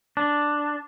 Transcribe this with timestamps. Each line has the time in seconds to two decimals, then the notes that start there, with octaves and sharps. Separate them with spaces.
0.17 D4